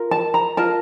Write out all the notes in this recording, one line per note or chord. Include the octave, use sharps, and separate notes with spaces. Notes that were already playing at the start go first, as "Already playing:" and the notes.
Already playing: F4 A#4
A5
A#5
F4 A#4 A5